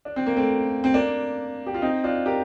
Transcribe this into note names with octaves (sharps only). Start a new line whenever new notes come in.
D4
C4
A#3
A3 C4
C4
A#3 D4
G4
F4
C4 D#4
D4 F4
G4 A#4